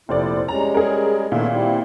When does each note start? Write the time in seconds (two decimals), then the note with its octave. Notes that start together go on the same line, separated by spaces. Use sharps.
0.09 F1 A#2 E4 C5 D5
0.48 G3 G#3 C#4 A#5
0.74 G#4 A#4
1.32 A#2 D#3 A3 B3 E5
1.51 G3 C4 E4